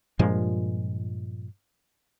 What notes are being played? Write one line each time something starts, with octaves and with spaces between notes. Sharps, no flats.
G2 A#2 F3 G#3